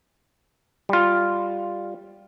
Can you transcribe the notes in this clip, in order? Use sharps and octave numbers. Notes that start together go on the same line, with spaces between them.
G3 F4